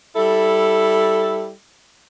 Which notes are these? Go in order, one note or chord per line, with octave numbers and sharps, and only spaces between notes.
G3 E4 A4